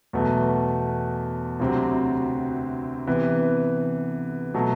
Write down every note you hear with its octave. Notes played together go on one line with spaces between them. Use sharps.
E2 B2 F#3 A3
D2 C3 F#3 C4 G4
C3 E3 B3
B2 F#3 A3